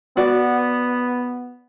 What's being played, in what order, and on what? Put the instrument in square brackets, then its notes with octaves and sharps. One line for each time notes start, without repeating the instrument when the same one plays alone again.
[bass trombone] B3 [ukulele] F#4 D5